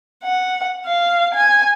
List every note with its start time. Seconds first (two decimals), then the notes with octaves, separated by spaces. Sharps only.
0.24 F#5
0.86 F5
1.34 G#5